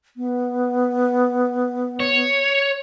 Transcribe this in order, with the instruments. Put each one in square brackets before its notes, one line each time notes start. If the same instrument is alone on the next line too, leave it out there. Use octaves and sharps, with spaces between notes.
[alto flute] B3
[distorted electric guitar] C#5